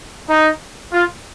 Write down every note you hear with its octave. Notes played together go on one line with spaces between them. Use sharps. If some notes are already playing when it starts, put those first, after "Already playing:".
D#4
F4